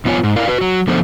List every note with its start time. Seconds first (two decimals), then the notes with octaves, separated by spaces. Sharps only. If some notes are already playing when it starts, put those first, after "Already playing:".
0.05 F2 B3 F4 C#5 G#5
0.23 G#2
0.36 E4 A#4 D5 F5
0.48 F#4 B4
0.61 F#3
0.88 D3 F3 A3 B3 C5